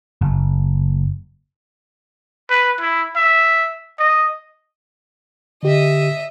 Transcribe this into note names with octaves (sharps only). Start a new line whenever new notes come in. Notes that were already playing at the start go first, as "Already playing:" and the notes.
F#1
B4
E4
E5
D#5
D3 G4 D#5 E5